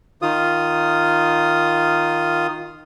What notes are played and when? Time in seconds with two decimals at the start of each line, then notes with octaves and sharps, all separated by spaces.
0.22 D#3 F4 D#6